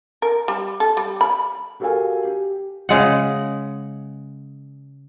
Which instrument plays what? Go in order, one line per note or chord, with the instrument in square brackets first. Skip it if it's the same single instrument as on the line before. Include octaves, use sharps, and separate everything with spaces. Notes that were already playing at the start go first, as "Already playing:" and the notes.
[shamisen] A#4
G3
A4
G3
B5
[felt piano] F#4 G4 A4 A#4 F5 G#5
G4
[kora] C#3 G#3 F#5